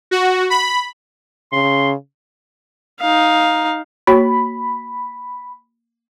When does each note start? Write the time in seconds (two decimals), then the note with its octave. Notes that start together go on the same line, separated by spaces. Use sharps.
0.11 F#4
0.50 B5
1.52 C#3 C6
3.01 D#4 F5
4.07 A#3 F#4 C#5 B5